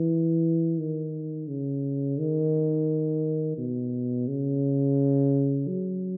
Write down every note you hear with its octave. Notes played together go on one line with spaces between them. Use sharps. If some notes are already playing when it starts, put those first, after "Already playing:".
Already playing: E3
D#3
C#3
D#3
B2
C#3
F#3